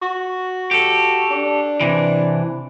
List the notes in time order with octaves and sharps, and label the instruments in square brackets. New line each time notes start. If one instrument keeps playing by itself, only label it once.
[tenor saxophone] F#4
[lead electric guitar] G4 A4
[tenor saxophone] D4
[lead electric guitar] C3 E3